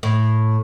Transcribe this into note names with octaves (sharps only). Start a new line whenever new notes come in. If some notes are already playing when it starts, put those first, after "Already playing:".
A2